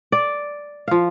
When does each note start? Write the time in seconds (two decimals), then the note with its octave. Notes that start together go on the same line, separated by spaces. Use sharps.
0.12 D5
0.88 F3 F5